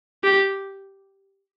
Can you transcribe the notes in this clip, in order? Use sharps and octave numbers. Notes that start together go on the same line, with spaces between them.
G4